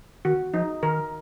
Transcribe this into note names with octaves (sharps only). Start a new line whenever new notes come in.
D#3 F#4
F3 D#4
D#3 A#4